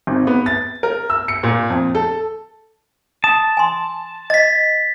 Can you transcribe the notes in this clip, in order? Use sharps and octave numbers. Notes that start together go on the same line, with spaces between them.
G#1
B3
A6
A#4
E6
C#7
A#2
F2
A4
A5 D#6
G#5 C6
D#5 A6 B6